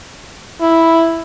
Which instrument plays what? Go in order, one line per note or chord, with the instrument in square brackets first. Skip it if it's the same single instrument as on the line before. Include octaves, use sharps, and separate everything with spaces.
[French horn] E4